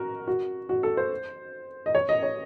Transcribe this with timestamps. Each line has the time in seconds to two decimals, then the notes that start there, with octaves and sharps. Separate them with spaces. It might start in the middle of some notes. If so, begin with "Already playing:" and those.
Already playing: F#4 A#4
0.27 F#4
0.69 F#4
0.83 A4
0.97 C5
1.86 D#5
1.95 C#5
2.09 D#5
2.23 C#5